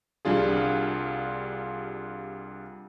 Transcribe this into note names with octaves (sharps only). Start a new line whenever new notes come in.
C2 G3 D4 F4 G#4